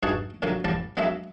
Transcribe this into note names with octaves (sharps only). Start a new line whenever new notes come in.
G2 D#4 F#4 G#4 A5
A#2 D3 F#3 A#3
A1 G3 D5 A5
F#3 G#3 A#3 D4 E5